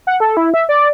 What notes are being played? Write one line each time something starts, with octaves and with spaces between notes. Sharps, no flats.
F#5
A4
E4
E5
D5